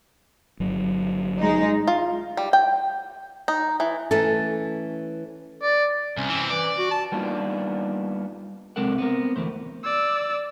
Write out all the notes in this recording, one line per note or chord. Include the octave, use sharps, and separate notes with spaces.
G1 F#3
G#3 D#4
F4
G3
G5
D#4
E3
E3 A3 C#4 A4
D5
C2 C#4
E3 C4
E3 D5
F#4
A5
G3 A#3 B3 D4 D#4 F4
C2 G#3 C4 A4 A#4 F#5
B3 C4 A#4
D2 G2 E3 A3 C5
D5 E6